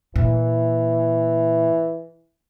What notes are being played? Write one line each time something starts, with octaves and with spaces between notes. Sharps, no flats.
A#2 E3